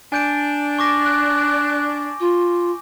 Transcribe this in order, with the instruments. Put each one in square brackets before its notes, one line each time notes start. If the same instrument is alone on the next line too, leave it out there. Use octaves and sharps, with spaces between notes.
[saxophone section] D4 [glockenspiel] G#5 G6 D7
[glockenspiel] C#6 D6 A#6
[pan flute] F#6
F4